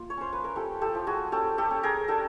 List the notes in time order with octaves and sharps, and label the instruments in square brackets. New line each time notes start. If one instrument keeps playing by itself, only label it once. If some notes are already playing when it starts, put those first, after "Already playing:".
Already playing: [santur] A#3 F4
C#5
C#4 C5
B4
A#4
F3 G4 A4
G4 A4
F3
F#4 G#4
C#4 G4 A4
G4 A4
C#4
G#4 A#4
D4 G4 A4